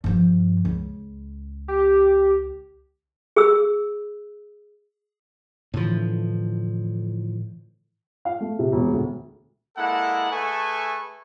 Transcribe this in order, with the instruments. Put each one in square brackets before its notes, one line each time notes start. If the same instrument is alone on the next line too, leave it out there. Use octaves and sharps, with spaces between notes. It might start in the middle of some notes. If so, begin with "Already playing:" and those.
[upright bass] G2 F3
C#2
[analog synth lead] G4
[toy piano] G#4 E6
[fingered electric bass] A2 F3 [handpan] D3 E3
[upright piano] F5
A3
C3
E1
D2
[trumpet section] G#3 A#3 E4 A4 F#5
A3 G#4 A4 B4 G#5 C#6